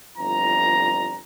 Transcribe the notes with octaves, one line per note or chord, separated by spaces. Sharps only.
G1 F2 E3 G3 A#5